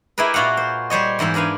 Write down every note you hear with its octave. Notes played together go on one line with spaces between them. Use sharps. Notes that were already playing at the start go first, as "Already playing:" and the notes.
E4 G4 G#4 A#4 B4
A#2 F4 F#4 F5 F#5
C5
G3 C5 C#5 D#5
E2 G#2 C5 E5 F5
D4 A#4 B4 F5 G#5